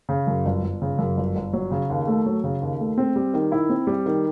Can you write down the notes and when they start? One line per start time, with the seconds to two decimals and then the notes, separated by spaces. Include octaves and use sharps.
0.09 C#3
0.27 F#2
0.46 G1
0.63 G1
0.82 C#3
0.99 F#2
1.17 G1
1.36 G1
1.53 F#3
1.71 C#3
1.90 D#2
2.07 A3
2.26 F#3
2.44 C#3
2.61 D#2
2.80 A3
2.98 C4
3.16 G3
3.34 D#3
3.52 E4
3.69 C4
3.87 G3
4.06 D#3